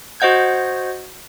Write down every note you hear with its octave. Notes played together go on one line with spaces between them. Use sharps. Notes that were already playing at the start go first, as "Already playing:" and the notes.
F#4 C5 D#5 F#5 G6 G#6